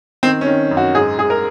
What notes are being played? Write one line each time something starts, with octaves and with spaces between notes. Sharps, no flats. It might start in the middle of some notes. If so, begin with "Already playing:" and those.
D#3 C4
C#4
D#3
F#2
F#4
G#2 G#4
G#2 G#4
A#4